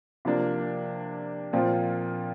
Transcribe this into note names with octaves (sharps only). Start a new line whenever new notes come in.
C3 F3 A#3 D4
A#2 F3 C4 F4